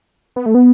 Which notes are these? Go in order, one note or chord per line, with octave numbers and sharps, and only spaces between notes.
B3
A3
B3